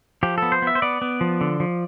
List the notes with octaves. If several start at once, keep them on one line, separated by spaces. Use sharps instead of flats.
F3 G4
B3 A4
C5
B3 E5
C5
B3 D5
B3
F3
D3
F3